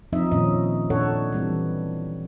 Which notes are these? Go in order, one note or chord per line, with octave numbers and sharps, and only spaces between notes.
F3 C4 D#4 D#5 E5
A#2 D#3 C#4 D#5
A#2 D4 A4 C#5 F#5
E3 G3 C4